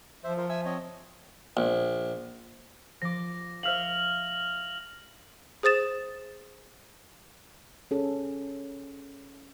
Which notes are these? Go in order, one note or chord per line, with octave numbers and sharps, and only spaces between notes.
F3 C5 E5
F4 A#4 C5
E5 G#5 E6
C4 C#5 D#5
A#1
F3 D6 A#6
C5 E5 F5 F6 F7 F#7
G#4 C5 D#6 A6 E7
C#4 G#4 A4